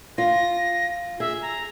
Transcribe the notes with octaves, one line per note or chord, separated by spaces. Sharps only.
F4 A#6
G#4 E5
A#5